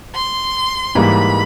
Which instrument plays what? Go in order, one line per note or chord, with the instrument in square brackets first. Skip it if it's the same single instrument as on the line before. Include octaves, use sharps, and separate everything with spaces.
[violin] C6
[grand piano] G#2 E3 G3 A#3 [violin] B5